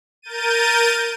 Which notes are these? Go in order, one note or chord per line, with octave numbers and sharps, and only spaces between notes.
A#4 G6 A6 D#7